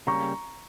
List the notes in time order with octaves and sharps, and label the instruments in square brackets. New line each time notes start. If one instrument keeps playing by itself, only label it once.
[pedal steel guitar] C#3 G3 A#3 C#4 G4 [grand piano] A#5 C#6